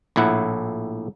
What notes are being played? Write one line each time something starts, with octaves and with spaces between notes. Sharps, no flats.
A#1 A2 E4 F#5